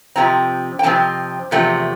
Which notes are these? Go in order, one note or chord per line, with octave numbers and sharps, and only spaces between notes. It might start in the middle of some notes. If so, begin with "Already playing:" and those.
F2 C3 F3 C4 A#5
G5
F2 C3 F3 C4 A5
E2 C3 F3 A3 C4